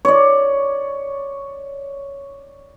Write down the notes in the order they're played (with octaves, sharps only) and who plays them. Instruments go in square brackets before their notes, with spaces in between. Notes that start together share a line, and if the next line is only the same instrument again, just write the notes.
[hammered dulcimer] C#5 D5